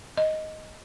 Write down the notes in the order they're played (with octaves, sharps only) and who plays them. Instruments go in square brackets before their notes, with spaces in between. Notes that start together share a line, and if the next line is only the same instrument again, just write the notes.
[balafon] D#5